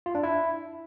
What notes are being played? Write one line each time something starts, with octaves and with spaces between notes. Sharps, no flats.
F4
D4
E4